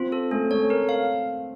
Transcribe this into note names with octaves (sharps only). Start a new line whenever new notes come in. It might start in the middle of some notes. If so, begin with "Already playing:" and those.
Already playing: C4 F4
A4
A3 C#4
A3 C#5
A#4
F5